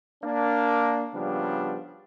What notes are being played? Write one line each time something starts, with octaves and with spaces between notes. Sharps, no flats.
A#3 D4
C#3 F3 G3 B3 D4